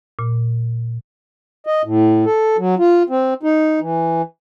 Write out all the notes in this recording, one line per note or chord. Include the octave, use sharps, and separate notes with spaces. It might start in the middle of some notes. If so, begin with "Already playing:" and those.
A#2
D#5
A2
A4
F#3
F4
C4
D#4
E3